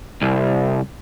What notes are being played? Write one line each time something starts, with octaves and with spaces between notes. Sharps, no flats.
C2